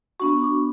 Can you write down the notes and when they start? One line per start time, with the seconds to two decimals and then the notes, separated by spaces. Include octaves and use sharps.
0.20 B3 D4 F#4 C#6
0.42 D6